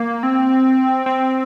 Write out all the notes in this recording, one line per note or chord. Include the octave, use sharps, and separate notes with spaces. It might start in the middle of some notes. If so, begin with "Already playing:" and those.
Already playing: A#3
C4
C4